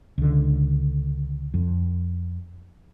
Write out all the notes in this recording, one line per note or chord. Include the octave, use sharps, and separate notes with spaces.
C#2 D3
F2